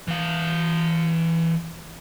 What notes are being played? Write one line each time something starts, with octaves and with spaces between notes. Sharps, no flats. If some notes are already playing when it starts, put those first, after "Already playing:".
E3 F5